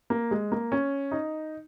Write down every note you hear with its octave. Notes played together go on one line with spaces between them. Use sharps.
A#3
G#3
A#3
C#4
D#4